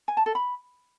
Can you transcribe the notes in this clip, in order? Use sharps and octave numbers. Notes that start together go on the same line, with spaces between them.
G#5
A5
A4
B5